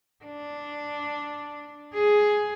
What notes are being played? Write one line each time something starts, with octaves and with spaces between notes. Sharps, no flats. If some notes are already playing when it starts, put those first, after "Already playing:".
D4
G#4